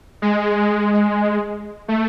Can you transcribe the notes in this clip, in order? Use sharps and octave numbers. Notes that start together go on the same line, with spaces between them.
G#3
A3